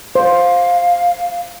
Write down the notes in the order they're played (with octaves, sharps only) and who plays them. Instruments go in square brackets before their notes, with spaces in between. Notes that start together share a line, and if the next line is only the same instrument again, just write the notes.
[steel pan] C5 [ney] F5